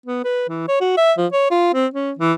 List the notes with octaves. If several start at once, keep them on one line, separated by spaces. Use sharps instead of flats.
B3
B4
E3
C#5
F#4
E5
F3
C#5
F4
C4
C#4
E3